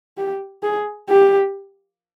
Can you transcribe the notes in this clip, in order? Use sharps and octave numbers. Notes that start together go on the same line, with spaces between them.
G4
G#4
G4